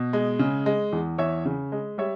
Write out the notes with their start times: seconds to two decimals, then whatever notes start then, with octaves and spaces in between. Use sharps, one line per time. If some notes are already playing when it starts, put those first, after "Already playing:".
Already playing: B2
0.13 G#3
0.39 C#3
0.66 G#3
0.93 E2
1.18 E2 C#5 E5
1.45 C#3
1.72 G#3
1.98 G3 C#5 E5